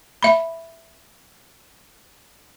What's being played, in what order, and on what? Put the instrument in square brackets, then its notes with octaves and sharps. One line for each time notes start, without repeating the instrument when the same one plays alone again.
[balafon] E5 B5